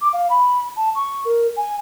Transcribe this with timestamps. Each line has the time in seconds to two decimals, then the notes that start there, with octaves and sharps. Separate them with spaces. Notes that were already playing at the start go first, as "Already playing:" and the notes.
0.01 D6
0.13 F5
0.30 B5
0.76 A5
0.95 C#6
1.25 A#4
1.56 G#5